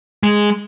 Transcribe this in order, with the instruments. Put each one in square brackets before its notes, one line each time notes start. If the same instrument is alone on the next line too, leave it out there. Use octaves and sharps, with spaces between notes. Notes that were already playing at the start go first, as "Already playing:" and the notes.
[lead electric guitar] G#3